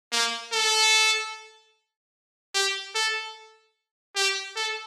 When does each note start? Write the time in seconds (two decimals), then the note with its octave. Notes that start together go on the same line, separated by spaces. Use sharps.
0.12 A#3
0.52 A4
2.54 G4
2.95 A4
4.16 G4
4.56 A4